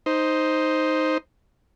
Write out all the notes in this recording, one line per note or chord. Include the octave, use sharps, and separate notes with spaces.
D#4 C5